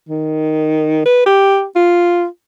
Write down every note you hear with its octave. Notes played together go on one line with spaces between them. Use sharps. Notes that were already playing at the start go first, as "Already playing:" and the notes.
D#3
B4
G4
F4